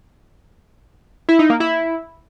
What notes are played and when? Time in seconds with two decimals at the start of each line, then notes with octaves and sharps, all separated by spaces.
1.29 E4
1.39 D#4
1.50 A#3
1.60 E4